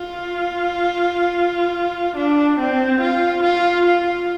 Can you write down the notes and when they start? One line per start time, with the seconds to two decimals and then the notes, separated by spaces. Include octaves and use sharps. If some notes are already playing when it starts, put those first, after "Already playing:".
Already playing: F4
2.16 D4
2.59 C4
3.01 F4
3.42 F4
3.85 F4